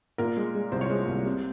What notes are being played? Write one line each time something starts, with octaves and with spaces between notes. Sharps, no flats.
A#2 A#4
G#3
G#3
C2 C5
C#5
G#3 C5
C2
C3